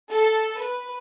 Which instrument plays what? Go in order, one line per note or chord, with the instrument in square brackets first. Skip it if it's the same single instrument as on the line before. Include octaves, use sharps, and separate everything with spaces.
[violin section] A4
B4